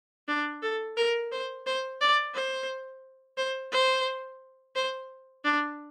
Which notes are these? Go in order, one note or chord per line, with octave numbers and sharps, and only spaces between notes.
D4
A4
A#4
C5
C5
D5
C5
C5
C5
C5
D4